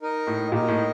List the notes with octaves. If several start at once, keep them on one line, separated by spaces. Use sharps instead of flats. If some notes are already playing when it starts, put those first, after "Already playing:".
D#4 A#4 D#5
A2
A#2 D#4 A#4 D#5
A2